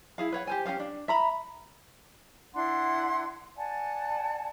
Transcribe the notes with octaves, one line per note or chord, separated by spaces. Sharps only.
E4 G#4 F5
B4 C#5 F#5
G4 C5 G#5
C#4 G4 G#4 F5
D4
E5 A#5 B5
D4 E4 F#5 C6
D5 F#5 G#5 A5